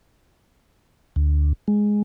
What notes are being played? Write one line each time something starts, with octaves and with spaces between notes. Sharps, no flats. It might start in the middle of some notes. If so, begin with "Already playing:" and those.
D2
G#3